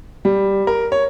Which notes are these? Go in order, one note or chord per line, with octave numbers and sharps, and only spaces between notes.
G3
A#4
C#5